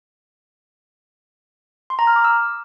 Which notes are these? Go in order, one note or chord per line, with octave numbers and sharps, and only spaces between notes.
C6
A#5
F6
D6
E6